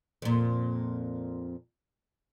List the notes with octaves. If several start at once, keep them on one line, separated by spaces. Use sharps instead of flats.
F2 A#2